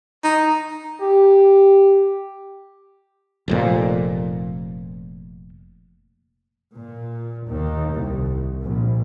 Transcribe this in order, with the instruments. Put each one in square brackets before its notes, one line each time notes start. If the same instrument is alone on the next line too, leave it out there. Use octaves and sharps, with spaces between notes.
[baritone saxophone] D#4
[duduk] G4
[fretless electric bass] F1 F2 A#2
[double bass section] A#2
D#2
C2
A#1